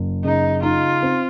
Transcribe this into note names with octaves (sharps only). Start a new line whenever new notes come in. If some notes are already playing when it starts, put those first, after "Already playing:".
Already playing: F#1
C#3 D#4
D#4 F4
C4